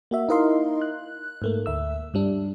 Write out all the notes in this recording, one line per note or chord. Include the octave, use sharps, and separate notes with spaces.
A#3 F#4 E5
D#4 E4 A#4 D#5 F5 C6
F#6
G#2 A3 A#3
D2 E5 E6
G2 G3 D4